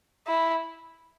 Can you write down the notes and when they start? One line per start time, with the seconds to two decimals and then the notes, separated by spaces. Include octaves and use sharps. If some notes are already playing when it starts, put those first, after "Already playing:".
0.27 E4